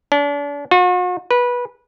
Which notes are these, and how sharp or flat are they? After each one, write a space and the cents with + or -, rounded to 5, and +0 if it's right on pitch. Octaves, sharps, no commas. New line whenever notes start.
D4 -40
F#4 -45
B4 -20